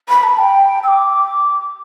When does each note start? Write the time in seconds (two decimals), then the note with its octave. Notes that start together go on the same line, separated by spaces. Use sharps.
0.09 B5
0.23 A5
0.39 G5
0.83 E6
0.88 D6